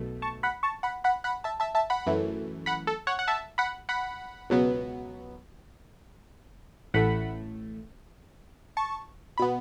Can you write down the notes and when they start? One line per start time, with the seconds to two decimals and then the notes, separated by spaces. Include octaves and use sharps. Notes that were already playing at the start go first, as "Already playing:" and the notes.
Already playing: B1 B2 A3
0.22 A5 C#6
0.43 F#5 B5
0.63 A5 C#6
0.83 F#5 B5
1.04 F#5 B5
1.24 F#5 B5
1.44 E5 A5
1.60 E5 A5
1.75 E5 A5
1.90 F#5 B5
2.06 F#2 E3 A3
2.66 F#5 B5
2.87 A4
3.07 C#5 F#5
3.19 F#5
3.28 E5 A5
3.58 F#5 B5
3.89 F#5 B5
4.50 C#2 B2 F#3 B3
6.94 A1 A2 A3 F#5 B5
8.77 A5 C#6
9.38 B2 B3 B5